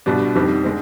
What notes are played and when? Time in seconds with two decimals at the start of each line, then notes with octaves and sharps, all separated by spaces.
0.06 C2 B2 G3 D4
0.35 F2 D#3 G3 C4
0.64 D3 G#3 C4